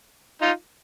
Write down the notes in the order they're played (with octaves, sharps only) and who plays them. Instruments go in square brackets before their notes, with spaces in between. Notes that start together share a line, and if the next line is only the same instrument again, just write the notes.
[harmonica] D#4 F4